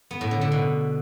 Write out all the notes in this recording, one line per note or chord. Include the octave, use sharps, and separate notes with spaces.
B3
A2
D3
D3
B2